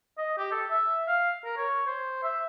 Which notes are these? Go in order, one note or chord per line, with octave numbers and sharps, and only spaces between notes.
D#5
G4
A4
E5
F5
A#4
C#5
C5
E5